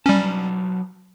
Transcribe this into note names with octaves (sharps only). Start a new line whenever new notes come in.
F#3 G3 C#4 B4 A5